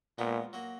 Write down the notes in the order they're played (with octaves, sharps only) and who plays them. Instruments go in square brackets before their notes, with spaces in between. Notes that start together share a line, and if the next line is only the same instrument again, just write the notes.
[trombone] A#2 [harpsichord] G#3 B3
[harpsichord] F#3 A#3